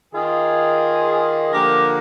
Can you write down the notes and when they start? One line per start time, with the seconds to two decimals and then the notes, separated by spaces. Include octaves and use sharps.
0.13 D#3 A#3 F4 G#4
1.51 D3 F3 A#3 G4 A#4